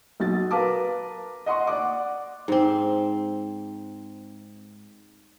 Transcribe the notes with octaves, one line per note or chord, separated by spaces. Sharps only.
B1 F#4 A6
A#4 B4 F5 A5 D6
D#5 F#5 C6 C#6
D5 F#5 D6
G#2 C4